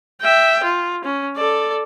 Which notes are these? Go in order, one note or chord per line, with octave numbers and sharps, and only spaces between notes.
E5 G5
F4
C#4
A4 D5